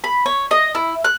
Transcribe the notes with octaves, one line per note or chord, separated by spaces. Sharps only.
B5
C#5
D#5
E4
F#6